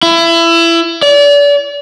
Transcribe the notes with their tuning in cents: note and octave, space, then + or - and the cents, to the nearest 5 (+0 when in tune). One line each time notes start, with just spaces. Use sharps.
E4 +25
D5 -35